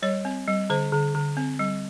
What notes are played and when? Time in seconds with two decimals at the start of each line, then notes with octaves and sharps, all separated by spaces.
0.02 G3 C#5
0.25 C4
0.47 G3
0.70 D3 C5
0.92 D3
1.15 D3
1.37 C4
1.59 G3